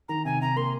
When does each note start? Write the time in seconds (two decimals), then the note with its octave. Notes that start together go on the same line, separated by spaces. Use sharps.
0.08 D#3 A#5
0.25 C3 G#5
0.41 C3 A#5
0.56 A#3 C6